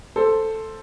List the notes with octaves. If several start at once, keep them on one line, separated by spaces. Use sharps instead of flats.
A4 C5